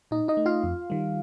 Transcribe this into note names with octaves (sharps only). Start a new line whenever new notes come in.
A#2 D#4 D#5
D#4 D#5
A3
F4 F5
F2
D#3 G3